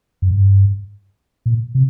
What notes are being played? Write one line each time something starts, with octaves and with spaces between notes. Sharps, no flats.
F#2
G2
A#2
C3